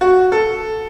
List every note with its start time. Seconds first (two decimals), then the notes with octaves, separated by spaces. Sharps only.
0.01 F#4
0.32 A4